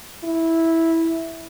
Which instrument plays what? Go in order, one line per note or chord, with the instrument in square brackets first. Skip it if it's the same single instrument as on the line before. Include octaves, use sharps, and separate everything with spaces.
[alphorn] E4